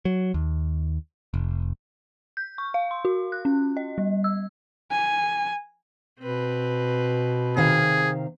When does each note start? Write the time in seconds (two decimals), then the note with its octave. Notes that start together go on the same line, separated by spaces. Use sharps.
0.05 F#3
0.34 D#2
1.34 F1
2.37 G6
2.58 C#6
2.74 F5
2.91 C6
3.05 F#4
3.32 F#6
3.45 C#4
3.77 D#5
3.98 G3
4.24 E6
4.91 G#5
6.20 B2 C4 B4
7.57 C3 D#3 G#4 F5